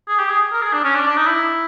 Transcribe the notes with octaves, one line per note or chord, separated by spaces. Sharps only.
G#4
G4
G#4
A#4
G#4
D4
C#4
D4
D4
D#4
E4